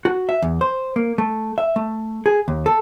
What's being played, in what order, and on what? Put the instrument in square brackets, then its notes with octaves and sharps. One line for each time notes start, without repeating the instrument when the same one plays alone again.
[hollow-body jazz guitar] F#4
E5
E2
C5
A#3
A3
E5
A3
G#4
D#2
A4